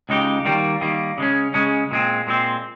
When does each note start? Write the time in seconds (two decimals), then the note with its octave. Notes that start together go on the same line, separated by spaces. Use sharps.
0.09 C#2 C#3 G#3 D#4 G4
0.45 D#3 G3 A#3
0.81 D#3 G3 A#3
1.18 C#3 G#3 C#4
1.54 C#3 G#3 C#4
1.91 A#2 G#3 C4
2.27 A#2 G#3 C4